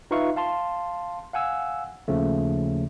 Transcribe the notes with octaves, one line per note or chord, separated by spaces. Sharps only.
D#4 F4 B4 E5 F5 C#6
F5 A5 C6
F5 F#5 G#5 E6
D#2 C#3 F3 A3